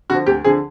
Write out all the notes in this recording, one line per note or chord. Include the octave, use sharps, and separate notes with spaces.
D3 F3 F#4
D2 G4
D3 F3 G#4